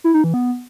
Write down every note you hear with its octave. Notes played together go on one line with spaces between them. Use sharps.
E4
D#4
E3
B3